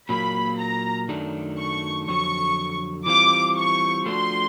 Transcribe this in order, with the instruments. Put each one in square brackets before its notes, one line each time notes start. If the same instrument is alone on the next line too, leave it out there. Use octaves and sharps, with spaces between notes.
[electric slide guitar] A#2 F#3 A#3 [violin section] B5
[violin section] A#5
[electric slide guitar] F#2 D#3 F#3 A3 D4
[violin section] C#6
[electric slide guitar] F2 D3 F#3 [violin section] C#6
[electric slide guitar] E3 G3 C4 F4 [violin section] D6
[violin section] C#6
[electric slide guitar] F3 A3 D4 F#4 [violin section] C6